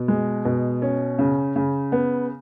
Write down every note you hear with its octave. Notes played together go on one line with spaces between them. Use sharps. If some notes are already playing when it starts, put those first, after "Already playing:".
Already playing: B2
G#3
B2
C#4
C#3
C#3
B3